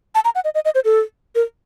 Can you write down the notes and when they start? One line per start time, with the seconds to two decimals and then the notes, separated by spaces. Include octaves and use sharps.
0.15 A5
0.25 A#5
0.35 F#5
0.45 D#5
0.55 D#5
0.65 D#5
0.75 C5
0.85 A4
1.35 A#4